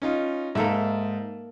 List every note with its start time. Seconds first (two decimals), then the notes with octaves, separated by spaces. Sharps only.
0.02 C#4 D#4 F4
0.55 G#2 A#3 A4 E5